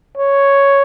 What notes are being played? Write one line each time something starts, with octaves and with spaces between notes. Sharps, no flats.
C#5